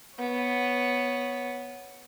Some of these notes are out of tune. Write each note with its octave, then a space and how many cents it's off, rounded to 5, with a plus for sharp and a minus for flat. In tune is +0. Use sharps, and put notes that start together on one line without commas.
B3 +0 C#5 +0